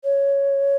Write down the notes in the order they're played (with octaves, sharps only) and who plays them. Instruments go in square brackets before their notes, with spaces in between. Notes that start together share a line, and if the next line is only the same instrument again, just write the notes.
[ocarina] C#5